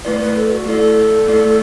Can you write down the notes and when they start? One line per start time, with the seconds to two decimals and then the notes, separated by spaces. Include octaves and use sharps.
0.05 A3 E4 B4 D5
0.21 B4
0.36 A4
0.51 F#4
0.66 A3 E4 A4 D5
1.28 A3 E4 D5